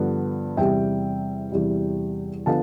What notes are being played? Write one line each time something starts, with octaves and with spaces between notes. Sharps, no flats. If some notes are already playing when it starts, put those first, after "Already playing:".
Already playing: G2 D3 F3 B3
E2 C3 G3 E5 G5
E2 C3 G3
D3 F3 B3 F5 A5